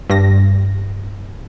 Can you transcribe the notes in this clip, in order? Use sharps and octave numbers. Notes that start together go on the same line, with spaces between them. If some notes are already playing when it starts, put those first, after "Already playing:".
G2 A#6